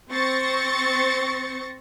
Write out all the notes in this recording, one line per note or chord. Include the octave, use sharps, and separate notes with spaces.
C4 C5 C#6 A6 A#6 C#7